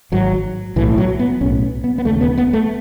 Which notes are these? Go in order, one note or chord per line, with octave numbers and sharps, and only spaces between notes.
G#1 G#2 F#3
B1 A2 E3
F#3
B3
B1 A2 C#4
B3
B3
E1 D#2 C#3 A3
B3
B3
A3